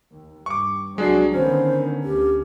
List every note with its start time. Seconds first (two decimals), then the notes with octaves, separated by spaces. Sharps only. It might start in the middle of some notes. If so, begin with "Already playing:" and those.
0.12 D#2
0.46 G2 C#6 D6
0.98 C2 F#3 G#3 D4 F#4 C7
1.34 D3 D#3 B3 C#4 C5
2.03 D2 G4